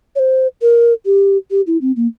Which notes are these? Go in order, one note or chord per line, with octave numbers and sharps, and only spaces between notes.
C#5
C5
A#4
G4
G4
E4
C4
A#3